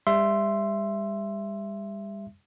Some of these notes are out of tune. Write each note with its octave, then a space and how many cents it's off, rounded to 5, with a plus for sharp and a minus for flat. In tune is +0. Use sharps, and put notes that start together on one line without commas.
G3 +40 E5 +15 C6 +0